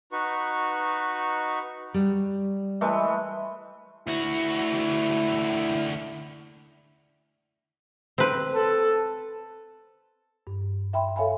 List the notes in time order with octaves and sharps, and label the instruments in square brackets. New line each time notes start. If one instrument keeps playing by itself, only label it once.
[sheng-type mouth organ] D#4 F#4 B4 C#6
[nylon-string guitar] G3
[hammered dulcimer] E3 G#3 A3
[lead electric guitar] D2 F#4 [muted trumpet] E4
[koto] C4 B4
[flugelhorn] A4
[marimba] G2
E5 G5 B5 C6
A4 C#5 E5 F5 G#5 B5